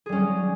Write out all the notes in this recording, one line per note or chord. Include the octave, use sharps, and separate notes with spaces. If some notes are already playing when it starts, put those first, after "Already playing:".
F#3 G3 C#4 G#4